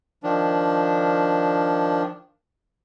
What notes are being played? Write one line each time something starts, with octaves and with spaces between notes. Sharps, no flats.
D#3 F3 D4